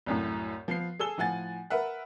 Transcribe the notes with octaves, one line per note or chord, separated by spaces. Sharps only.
C2 F#2 A2
F3 B3 C7
G#4 A4 E6 G7
A2 F3 F#5 G#5 A6
A#4 B4 E5 F#5